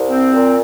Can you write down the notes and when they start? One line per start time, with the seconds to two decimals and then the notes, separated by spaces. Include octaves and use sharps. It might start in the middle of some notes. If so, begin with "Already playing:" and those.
Already playing: C2
0.10 C4
0.33 A#2